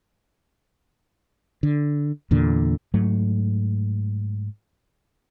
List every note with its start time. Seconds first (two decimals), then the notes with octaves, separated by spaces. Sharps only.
1.63 D3
2.31 E2 A#2 D3
2.94 G#2 F#3 A3